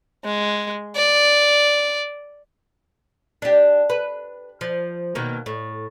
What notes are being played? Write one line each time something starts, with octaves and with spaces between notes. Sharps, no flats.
G#3
D5
D4 G4
B4
F3
B2 D#3 A#3
A2